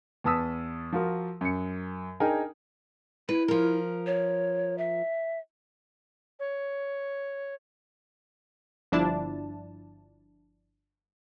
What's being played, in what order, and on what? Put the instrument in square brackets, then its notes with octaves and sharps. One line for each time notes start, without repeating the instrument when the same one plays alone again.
[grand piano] E2 B4 A5 D#6 E6 B6
F3 F4 F#4 A#4
F#2 C#7
D4 D#4 G#4 A#4 G5 G#5
[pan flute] E4 [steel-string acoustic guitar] B4
[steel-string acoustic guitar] F3 A#4
[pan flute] C#5
E5
[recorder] C#5
[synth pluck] G1 F3 D4 E4 A5